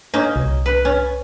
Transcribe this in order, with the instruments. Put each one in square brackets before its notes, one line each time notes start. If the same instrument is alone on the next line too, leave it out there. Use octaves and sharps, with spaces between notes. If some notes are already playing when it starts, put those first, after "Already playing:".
[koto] A#3 C#4 D#4
[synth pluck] C2
[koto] B4
C#4